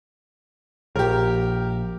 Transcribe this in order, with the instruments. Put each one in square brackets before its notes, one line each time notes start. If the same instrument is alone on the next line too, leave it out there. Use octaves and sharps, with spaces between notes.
[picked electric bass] A#1 [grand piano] G4 A#4